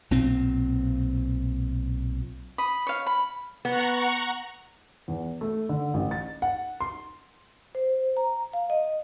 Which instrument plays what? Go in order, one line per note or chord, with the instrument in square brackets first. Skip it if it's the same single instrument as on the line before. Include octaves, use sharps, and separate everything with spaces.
[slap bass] B1 A#2 C4
[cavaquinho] B5 D#6
C#5 F5
B5
[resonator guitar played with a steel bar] B3 [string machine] F#5 A#5 C#6
[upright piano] E2
A3
D3
A1
A6
F#5
C6
[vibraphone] C5
A#5
F5
D#5